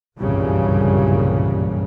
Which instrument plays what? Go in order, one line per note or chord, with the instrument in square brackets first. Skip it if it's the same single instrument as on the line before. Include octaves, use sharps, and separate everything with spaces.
[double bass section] F#1 C2 G2 A#2 C#3 E3